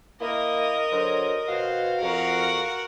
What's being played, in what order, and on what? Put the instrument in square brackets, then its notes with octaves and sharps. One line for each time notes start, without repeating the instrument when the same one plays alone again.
[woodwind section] A#3 [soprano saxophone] E4 [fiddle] A#4 D#5
[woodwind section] D3 F#3 [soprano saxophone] C5
[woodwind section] B2 F#4 [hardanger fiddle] C5 [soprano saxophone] F5
[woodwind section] F2 [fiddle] F#4 [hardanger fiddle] A#4 F#5